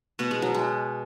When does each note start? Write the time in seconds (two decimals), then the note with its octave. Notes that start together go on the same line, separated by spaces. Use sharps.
0.19 B2 B3
0.31 G#3
0.42 F#3
0.54 G#3